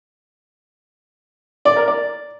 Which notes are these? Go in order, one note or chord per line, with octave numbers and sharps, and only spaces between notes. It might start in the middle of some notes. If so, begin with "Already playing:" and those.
D5
A#4
D5